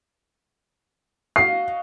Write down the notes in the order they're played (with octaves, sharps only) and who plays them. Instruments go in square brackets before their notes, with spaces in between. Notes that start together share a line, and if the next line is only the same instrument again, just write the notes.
[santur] F#4 D#5 F5 [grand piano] C7